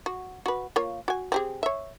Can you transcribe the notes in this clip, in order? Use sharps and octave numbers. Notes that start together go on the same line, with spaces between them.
F#4
F#4 B4
A#3 F4 C#5
F#4 G#5
C4 G4 G#4
C#5 E5